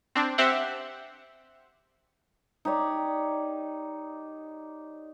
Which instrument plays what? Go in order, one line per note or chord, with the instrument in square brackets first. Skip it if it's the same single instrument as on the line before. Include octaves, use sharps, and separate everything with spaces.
[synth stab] C4 D4
C4 G4 C5 E5 F#5
[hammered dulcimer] D#4 G4 C#5 D5